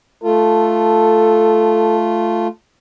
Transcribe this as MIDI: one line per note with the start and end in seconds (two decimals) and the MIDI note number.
0.24 2.47 57
0.24 2.47 65
0.24 1.98 69